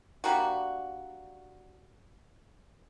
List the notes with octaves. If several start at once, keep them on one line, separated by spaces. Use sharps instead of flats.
G3 A#3 D4 F#4